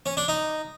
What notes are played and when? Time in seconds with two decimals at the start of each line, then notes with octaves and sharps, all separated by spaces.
0.06 C#4
0.17 D4
0.28 D#4